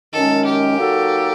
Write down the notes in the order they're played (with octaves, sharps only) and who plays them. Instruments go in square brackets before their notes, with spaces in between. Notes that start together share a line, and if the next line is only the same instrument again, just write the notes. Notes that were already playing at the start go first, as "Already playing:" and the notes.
[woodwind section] F#2 D#3 G#3 C#4 [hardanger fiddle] A4
[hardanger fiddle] G4
[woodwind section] F#3 A#3 D#4 F#4 A4